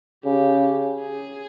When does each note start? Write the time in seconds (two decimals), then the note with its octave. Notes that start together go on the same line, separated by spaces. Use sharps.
0.24 C#3 G4
1.00 G#4